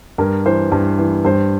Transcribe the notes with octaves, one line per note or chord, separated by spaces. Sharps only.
G2 A#4
E3 C5
G2
E3
G2 C5